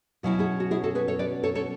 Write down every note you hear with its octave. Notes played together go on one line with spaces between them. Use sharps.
B2 F#3 C#4 E4 F#4
E4 G#4
F#4
E4 G#4
F#4 A4
G#4 B4
A4 C#5
B4 D5
A4 C#5
A4 C#5